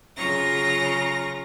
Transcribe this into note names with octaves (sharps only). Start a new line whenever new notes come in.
C#3 F#3 F4 A#5 C#6 A#6